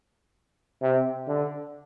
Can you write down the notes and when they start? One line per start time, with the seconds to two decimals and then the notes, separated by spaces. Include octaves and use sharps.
0.82 C3
1.28 D3